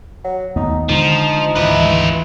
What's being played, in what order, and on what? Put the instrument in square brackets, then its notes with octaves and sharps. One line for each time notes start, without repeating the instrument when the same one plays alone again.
[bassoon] F#3
[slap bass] D#2 A3 B3 [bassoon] D#4
[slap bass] D3 D#3 G#3 [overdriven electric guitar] F3 [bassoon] D#4
[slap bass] G#1 D2 [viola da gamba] E3 [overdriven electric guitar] F4 B4